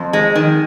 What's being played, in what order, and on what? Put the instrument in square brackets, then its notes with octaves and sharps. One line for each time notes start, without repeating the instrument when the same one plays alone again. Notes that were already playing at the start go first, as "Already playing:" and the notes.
Already playing: [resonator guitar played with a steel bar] F2
G#3
D#3